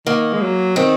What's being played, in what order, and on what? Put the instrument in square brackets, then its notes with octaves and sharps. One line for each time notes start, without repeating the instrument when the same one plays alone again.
[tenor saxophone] D#3 [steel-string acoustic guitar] A#3
[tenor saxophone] G#3
F#3
[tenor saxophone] D#3 [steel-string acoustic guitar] C4